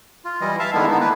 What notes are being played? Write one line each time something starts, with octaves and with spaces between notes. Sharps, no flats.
F4
E3 G3 E4 D#5
E5 F5 A5
D3 D#3 G#3 B3 D4 E4
B3 D#4
A#3 D4 E4 B4